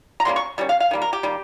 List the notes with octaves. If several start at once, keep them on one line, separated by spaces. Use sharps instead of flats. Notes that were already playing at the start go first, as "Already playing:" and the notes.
A#5
D#3 G3 A#3 C#4 C6
C#6
D#3 G3 C#4
F5
F5
D#3 G3 A#3
A#4
G4
D#3 G3 A#3